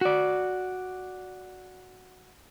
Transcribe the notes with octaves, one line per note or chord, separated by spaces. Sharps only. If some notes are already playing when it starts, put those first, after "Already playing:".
F#4 D5